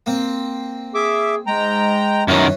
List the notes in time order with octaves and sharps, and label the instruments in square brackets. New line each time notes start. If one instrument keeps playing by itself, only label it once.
[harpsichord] A#3 C4
[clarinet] G#4 [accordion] E5 D6
[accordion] G#2 G5 A#5 [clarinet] G#3
[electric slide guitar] F#2 D#3 [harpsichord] E3 C#4